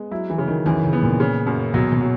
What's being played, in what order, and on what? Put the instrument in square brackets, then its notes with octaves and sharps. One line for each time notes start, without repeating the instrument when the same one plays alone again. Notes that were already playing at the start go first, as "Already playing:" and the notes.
Already playing: [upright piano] G#3 B3
[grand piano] F#3 [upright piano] E4
[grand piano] E3
[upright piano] C#3
[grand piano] D#3
[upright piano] F#2 [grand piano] E3
[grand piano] C#3
[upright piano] B3
[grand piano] A#2
[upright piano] C#3
F#2
[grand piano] B2 [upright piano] F#3
[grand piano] B2
[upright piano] F#3